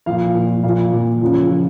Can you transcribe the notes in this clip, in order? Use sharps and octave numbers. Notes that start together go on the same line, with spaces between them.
A#2 F3 F5
A#2 F3
A#2 F3 F5
A#2 F3
C#3 F3
F3